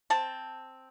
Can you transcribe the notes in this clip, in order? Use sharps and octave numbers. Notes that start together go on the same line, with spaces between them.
C4 A5